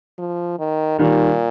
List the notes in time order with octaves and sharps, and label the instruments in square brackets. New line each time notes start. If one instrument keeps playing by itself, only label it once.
[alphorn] F3
D#3
[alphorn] A#2 [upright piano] D#3 G3